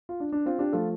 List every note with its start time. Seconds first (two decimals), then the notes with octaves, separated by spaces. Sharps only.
0.09 F4
0.20 D4
0.32 D4
0.46 C4 F4
0.59 D4 G4
0.73 F3 A3 F4 A4